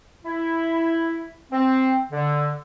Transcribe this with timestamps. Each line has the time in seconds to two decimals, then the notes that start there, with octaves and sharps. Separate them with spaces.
0.25 E4
1.52 C4
2.12 D3